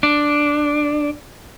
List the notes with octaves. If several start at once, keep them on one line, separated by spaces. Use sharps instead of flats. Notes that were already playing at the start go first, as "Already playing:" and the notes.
D4